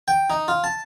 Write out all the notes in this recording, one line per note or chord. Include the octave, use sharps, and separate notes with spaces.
G5
D#4
F4
A5